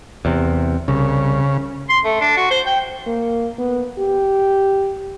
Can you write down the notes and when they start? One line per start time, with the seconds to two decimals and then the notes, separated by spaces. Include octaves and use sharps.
0.25 E2 C3
0.88 C2 C#3
1.89 C6
2.05 A3
2.21 D4
2.37 F#4
2.51 C5
2.66 G5
3.07 A#3
3.58 B3
3.99 G4